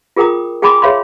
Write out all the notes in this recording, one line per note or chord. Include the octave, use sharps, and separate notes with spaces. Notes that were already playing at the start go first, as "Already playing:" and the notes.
F4 G#4 A#4 G5 A#5 D#6
G#4 G5 G#5 B5 C6 D6
G#4 C#5 E5 F5 B5 C6